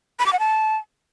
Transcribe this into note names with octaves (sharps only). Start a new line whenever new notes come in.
B5
D6
F#5
A5